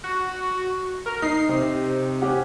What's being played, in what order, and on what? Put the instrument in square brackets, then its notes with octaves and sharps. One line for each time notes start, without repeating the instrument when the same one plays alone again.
[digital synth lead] F#4
A#4
[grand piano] D#4 [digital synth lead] C7
[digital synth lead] C3
[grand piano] C#4 G4 F#5